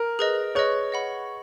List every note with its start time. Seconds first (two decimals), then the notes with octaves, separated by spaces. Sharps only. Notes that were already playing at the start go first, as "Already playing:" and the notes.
Already playing: A#4
0.19 G#4 B4 D#5
0.55 G#4 B4 C#5 D#5
0.92 D#5 F#5 B5